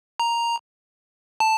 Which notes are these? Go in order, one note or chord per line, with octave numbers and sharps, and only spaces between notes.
A#5
A5